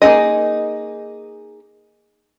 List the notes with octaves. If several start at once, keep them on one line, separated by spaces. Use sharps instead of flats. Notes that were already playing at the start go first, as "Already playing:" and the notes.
A#3 D#4 E4 G#4 D#5